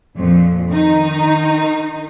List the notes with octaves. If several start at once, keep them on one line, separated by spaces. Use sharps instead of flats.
F2 A#2
D#3 D#4